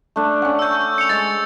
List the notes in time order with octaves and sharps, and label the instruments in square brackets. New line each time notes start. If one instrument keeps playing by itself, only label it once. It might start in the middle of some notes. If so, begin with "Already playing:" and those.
[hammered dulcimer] A3 D4
C#4 F#5
[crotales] E6 G6
C#7 F7
[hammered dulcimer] G#3 C5 [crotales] A6